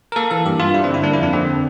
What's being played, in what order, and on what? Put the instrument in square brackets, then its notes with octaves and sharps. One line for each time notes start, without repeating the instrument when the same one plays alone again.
[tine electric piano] A#4
A#3 A4
E3 A4
G2 G4
G2 F4
G3 E4
C4
D3
E4
A#3 D4
E4
F2 D4
D3 C4